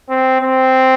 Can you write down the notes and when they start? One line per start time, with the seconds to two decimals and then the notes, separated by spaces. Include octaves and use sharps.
0.09 C4
0.41 C4